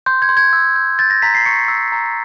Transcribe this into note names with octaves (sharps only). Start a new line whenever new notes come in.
C6 G6
G#6
C6
G#6
E6
G6
G6 A6
A#6
A#5 B6
C7
C#6 C#7
E6
A#5